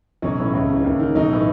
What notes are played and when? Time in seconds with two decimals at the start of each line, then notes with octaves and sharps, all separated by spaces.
0.22 B1 C#4
0.38 A2 E3 C#4
0.53 C#2
0.69 C#3 E3
0.84 D#2
1.00 D#3
1.15 B1 D#4
1.31 A2 E3